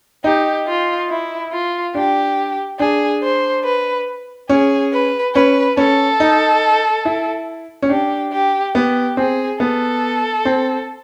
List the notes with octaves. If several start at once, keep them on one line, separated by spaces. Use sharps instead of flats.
D#4 G4
F4
E4
F4
D4 G4
D4 G#4
C5
B4
C#4 G#4
B4
C#4 B4
C#4 A4
D#4
E4
C#4
D4 G4
G4
B3 G4
C4 G#4
B3 A4
C4